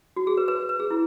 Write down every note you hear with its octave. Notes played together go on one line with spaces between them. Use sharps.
F#4
G#4
B4
B4
B4
G#4
E4